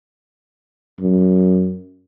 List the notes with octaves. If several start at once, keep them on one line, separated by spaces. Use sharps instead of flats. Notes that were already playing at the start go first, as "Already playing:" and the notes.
F#2